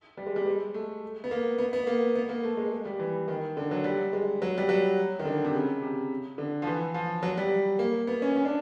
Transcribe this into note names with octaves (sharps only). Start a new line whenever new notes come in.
G3
G#3
G3
G#3
A3
B3
A#3
B3
B3
A#3
B3
A#3
A3
G#3
G#3
G3
E3
D#3
D3
F#3
G3
G#3
F#3
G3
F#3
D#3
D3
C3
C#3
C3
D3
F3
E3
F3
F#3
G3
A#3
B3
C#4
C#4
D4